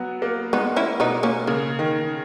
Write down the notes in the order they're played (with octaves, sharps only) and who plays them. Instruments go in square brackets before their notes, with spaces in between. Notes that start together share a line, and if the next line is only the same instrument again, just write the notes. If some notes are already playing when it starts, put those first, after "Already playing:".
Already playing: [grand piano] F#3 B3
A#3
[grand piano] G#3 [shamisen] B3 D#4
[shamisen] C#4 E4
[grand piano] B2 [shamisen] B3 D#4
[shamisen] A#3 C#4
[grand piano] C#3 [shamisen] A#3
[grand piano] D#3